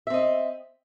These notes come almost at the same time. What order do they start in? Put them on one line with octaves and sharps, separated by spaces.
E5 C4 D#5